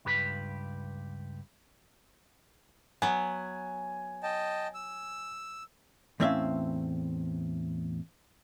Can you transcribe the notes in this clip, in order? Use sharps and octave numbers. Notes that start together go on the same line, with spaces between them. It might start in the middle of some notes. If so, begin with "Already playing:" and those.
C#2 G2 G4 B4 B5
F#3 B3 G#5
D#5 G5 A5
E6
E2 A2 C4 C#4 E5 F5